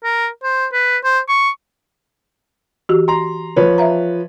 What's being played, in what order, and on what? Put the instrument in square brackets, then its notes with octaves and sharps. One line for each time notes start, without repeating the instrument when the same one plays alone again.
[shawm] A#4
C5
B4
C5
C#6
[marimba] E3 F#4 G4
[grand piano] A#5 C6
F3 B4 C#5
[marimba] E5 F5 A#5